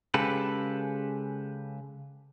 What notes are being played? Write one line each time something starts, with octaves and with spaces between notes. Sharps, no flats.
C#3 G#3 G4 A4 B4